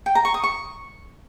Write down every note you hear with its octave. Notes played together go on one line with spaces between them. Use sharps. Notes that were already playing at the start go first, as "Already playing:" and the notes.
G5
A#5
C#6
D#6
C#6